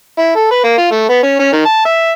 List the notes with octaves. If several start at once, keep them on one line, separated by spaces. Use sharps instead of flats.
E4
A4
B4
A#3
F4
A3
B3
C#4
C#4
D#3
A5
E5